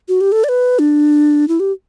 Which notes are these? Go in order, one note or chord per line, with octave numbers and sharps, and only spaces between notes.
F#4
G4
A4
D5
B4
D4
E4
G4